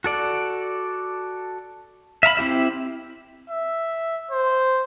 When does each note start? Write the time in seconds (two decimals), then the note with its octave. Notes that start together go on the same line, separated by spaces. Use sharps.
0.04 F#4 A4 D5
2.23 E5 F5 A#5 B5
2.37 C4 E4 G4 E5
3.50 E5
4.31 C5